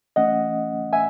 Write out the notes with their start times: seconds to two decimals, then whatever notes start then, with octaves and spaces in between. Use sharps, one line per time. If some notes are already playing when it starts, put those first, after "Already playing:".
0.16 E3 A3 C#4 D#5 F#5
0.93 E5 G#5